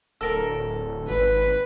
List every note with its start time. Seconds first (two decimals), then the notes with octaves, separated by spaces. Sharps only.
0.21 D1 A4 A#4
1.08 G#1 B4